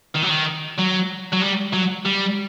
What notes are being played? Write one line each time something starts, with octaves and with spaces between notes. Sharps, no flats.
D#3
F#3
D#3
F#3
F#3
G3
F#3
G3